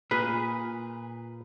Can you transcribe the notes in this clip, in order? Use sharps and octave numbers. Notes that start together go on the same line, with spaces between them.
A#2 G#4 B4